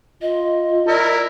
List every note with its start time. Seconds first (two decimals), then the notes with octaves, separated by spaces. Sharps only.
0.21 F4 D#5
0.88 E4 A#4 D5